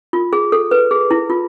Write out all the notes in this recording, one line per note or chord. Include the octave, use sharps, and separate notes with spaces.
F4
G#4
A4
B4
G#4
E4
F4